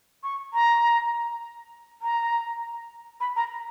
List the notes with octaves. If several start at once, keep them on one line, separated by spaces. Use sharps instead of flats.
C#6
A#5
A#5
B5
A#5